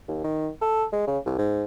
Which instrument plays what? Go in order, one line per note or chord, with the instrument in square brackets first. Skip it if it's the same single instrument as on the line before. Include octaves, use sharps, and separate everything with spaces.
[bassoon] D#2
D#3
A4
G#3
C#3
C2
G#2